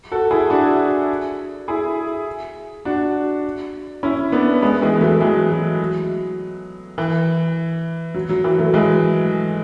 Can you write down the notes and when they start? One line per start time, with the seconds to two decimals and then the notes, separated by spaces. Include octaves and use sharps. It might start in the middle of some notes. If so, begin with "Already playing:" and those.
0.12 F#4 A4
0.31 E4 G#4
0.50 D4 F#4
1.68 E4 G#4
2.85 D4 F#4
4.03 C#4 E4
4.32 B3 D4
4.62 G#3 B3
4.82 E3 G#3
5.01 F#3 A3
5.21 E3 G#3
5.51 F#3
6.98 E3
8.14 F#3
8.29 F#3
8.44 E3
8.59 F#3 A3
8.74 E3 G#3